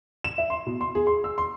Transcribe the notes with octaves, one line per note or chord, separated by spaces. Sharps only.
E7
E5
C6
B2
C6
G#4
C6
E6
C6